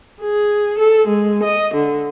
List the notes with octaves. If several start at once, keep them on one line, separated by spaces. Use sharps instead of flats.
G#4
A4
G#3
D#5
D3